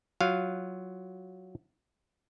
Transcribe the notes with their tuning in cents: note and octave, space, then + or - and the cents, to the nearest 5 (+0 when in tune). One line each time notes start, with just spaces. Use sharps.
F#3 +0 F4 +0 F5 +0